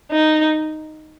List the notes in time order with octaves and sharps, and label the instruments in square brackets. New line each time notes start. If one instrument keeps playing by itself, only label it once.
[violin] D#4